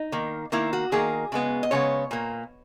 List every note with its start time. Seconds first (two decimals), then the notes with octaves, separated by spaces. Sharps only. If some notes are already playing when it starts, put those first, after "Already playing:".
Already playing: D#4
0.12 D#3 A#3
0.52 D#3 A#3 E4
0.73 F#4
0.92 D#3 A#3 G#4
1.32 C#3 G#3 B3
1.63 D#5
1.71 C#3 G#3 B3 C#5
2.11 A#2 A#3